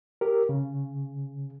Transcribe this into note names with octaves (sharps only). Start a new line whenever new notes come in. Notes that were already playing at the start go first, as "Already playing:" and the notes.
G4 A#4
C#3